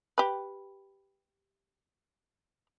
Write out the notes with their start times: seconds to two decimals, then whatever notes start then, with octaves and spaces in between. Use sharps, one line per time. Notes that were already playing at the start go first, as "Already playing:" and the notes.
0.18 G4 B4